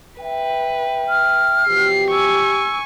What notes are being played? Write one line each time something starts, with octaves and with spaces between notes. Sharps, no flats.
B4 E5 G5
F6
B2 E3 F3 G4 C7
G#5 C#6 E6